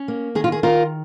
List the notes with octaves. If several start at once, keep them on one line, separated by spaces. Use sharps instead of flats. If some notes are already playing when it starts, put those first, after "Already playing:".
Already playing: C#4
A#3
D#3 G#4
F4
G#4
D#3 F4 A#4